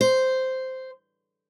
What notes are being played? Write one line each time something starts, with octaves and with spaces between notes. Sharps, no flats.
C5